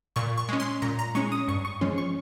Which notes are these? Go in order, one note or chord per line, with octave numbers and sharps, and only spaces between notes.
A#2 C#6
C#6
G#3 C#4
C6
A#2 A#5
A#5
G#3 C#4 C#6
D#6
G2 C#6
C#6
F3 G#3 C#4 C6
C#6